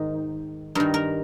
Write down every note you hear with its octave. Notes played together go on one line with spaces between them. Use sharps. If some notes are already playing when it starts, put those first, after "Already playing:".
Already playing: G#2 D#3
G2 D#3 A#4
A#4